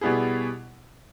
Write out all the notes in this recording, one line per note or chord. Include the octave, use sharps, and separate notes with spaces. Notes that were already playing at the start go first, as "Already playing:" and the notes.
B2 G3 B3 E4 G#4